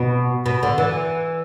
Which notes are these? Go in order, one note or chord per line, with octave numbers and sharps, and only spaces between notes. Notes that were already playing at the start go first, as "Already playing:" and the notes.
Already playing: B2
B2
D3
E3